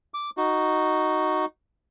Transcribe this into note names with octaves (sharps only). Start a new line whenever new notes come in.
D6
D#4 F#4